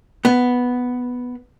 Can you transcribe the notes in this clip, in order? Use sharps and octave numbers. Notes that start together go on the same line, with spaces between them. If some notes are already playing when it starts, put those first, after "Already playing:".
B3